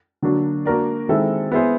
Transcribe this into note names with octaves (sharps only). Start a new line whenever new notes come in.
D3 F#3 A#3 D4 F#4
A#3 D4 F#4 A#4 D5
D#3 G#3 C4 E4 A4
B3 E4 G#4 C5